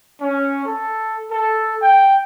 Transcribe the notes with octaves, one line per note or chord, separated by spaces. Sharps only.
C#4
A4
A4
G5